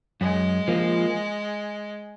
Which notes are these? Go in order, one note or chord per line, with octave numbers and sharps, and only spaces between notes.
F#2 G#3
F3 A#3